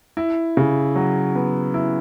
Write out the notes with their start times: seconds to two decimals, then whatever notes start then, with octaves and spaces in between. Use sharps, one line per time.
0.17 E4
0.57 C#3
0.96 F#3
1.35 B3
1.74 E4